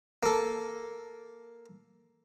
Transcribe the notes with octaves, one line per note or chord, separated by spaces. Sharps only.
A#3 A4